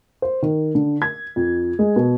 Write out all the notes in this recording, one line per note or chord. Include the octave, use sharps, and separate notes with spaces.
C5
D#3
D3
G#6
F2
G#3
B2